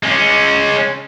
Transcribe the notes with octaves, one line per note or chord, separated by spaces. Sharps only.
G#3 C#4